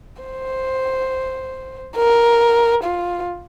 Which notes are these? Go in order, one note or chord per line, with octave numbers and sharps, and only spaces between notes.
C5
A#4
F4